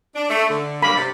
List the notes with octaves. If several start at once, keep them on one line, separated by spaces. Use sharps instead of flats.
D4
A3
D3
G2 F#3 A#3 B5
C3 D5